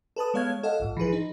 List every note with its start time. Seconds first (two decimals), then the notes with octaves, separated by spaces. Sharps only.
0.16 A4 B4 A5 D#6
0.34 G#3 B3 C#5 F5 F6 G#6
0.63 A4 D#5 F5 F#5
0.80 A#1 G#2
0.97 E3 F3 G#4 B4
1.13 D#4